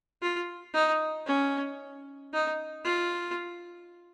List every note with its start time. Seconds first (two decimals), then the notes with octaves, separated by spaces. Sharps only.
0.22 F4
0.74 D#4
1.27 C#4
2.33 D#4
2.85 F4